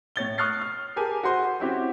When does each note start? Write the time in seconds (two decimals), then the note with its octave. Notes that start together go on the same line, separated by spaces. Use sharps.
0.16 A2 C#5 A6 G7
0.38 C#6 D#6 F6 F#6 A6 C7
0.62 F6
0.96 G4 G#4 A#4 G#5 A5
1.23 F#4 G#4 C5 C6
1.60 C4 C#4 E4 F#4 G4